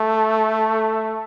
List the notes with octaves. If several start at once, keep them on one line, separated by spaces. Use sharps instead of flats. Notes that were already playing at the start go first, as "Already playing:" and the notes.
Already playing: A3